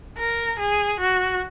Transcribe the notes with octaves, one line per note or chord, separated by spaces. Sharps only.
A#4
G#4
F#4